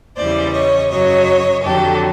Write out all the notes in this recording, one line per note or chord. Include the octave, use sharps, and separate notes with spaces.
E2 C#3 E3 G3 C5 D5
C#5 D#5
F#2 C#3 F#3 C#5 D#5
F2 D3 F#3 G4 A4